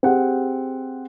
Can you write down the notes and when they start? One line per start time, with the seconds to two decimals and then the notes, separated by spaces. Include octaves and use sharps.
0.03 C4 G4 G#4 F#5